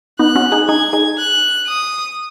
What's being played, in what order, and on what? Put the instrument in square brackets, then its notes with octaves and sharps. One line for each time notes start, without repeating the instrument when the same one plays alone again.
[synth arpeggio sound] B3 D#4 [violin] F#6
[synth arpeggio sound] C#4 F#4
D#4 G#4
[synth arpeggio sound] D#4 G#4 [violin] G#6
[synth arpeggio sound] D#4 G#4
[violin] F#6
D#6